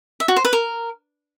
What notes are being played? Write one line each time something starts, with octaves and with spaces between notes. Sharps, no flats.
E5
F#4
C5
B4
A#4